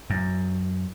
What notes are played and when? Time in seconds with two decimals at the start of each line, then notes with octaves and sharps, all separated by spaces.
0.10 F#2